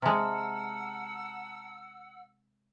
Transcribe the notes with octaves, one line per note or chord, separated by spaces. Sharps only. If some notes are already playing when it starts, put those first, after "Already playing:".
C3 G#3 F#5 A5 A#5 E6 F6